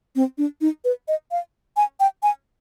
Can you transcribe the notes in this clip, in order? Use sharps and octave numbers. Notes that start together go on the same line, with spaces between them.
C4
D4
D#4
B4
D#5
F5
G#5
G5
G#5